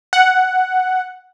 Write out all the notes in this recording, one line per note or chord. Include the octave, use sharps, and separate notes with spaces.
F#5